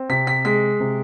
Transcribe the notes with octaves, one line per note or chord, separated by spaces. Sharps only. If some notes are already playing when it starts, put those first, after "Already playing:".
Already playing: C4
C3 B6
B6
G#3 B6
C3